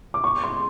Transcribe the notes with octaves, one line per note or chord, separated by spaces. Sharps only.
D6
C#6
C6